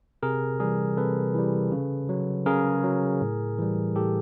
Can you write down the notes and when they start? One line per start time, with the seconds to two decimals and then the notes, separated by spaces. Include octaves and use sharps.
0.23 C3 G#4 A#4
0.60 E3 G3 G#4 A#4
0.97 C3 A4 B4
1.34 E3 G3
1.72 C#3
2.09 F#3
2.46 C#3 G#4 A#4
2.84 F#3
3.21 A2
3.59 E3 G3
3.96 A2 G4 A4